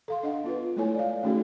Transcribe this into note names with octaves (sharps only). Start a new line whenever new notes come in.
A4 F5 C6
D4 D#5 F#5
B3 F4 B4
G#3 A3 E4 A4 C#5 G#5
D5 F5
A3 C#4 D#4 F#4 G#4 A4